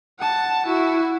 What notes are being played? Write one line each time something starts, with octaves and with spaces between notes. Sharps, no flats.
F#5 A5
E4 F#4